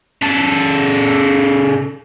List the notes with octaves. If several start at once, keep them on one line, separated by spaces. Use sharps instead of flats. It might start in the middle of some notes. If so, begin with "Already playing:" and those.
C#3 A4